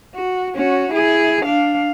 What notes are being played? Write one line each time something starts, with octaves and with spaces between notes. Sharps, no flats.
F#4
C#4 F#4
E4 G#4
D4 F5